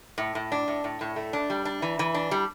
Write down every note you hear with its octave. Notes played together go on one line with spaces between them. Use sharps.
A2
A2
D4
A2
A2
A2
A3
D4
G3
D4
E3
E3
D4
G3